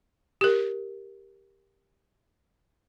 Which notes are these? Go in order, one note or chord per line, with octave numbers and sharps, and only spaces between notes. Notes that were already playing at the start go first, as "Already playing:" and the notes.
G4 A#4